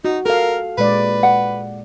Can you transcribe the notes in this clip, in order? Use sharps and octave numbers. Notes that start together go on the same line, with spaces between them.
D#4 F#4
A4 A#4 F5
A#2 G#3 B4 D5
F#5